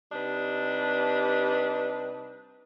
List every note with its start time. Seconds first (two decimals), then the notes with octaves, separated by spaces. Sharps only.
0.12 C3 G3 D4 D#4 B4